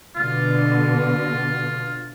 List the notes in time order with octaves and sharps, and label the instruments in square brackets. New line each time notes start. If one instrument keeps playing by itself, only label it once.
[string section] B2 D3 [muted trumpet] F4